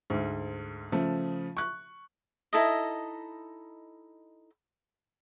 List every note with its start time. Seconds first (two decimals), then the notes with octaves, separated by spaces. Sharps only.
0.10 D2 G#2
0.92 C#3 F3 A3
1.57 C#6 F#6
2.53 D#4 E4 A4 D#5